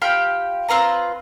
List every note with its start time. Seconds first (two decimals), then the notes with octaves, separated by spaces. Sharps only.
0.02 F4 G4 G5 B5
0.69 C4 F4 B4 A#5